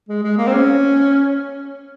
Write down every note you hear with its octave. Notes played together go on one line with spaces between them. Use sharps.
G#3
G#3
A#3
C4
C#4